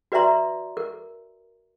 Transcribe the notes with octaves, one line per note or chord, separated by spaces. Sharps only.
F#4 B4 D5 E5 A#5 C6
A#4